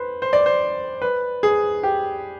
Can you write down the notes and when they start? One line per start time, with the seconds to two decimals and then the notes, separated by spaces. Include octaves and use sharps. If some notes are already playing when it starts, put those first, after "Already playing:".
Already playing: B4 C5
0.22 C5
0.33 D5
0.46 C5
1.02 B4
1.43 G#4
1.83 G4